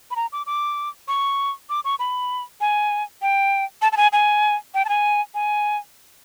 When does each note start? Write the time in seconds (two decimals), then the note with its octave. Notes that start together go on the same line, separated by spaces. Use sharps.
0.11 B5
0.16 A#5
0.32 D6
0.46 D6
1.08 C#6
1.70 D6
1.85 C#6
1.99 B5
2.61 G#5
3.22 G5
3.82 A5
3.92 A5
3.97 G#5
4.13 G#5
4.74 G5
4.85 A5
4.89 G#5
5.35 G#5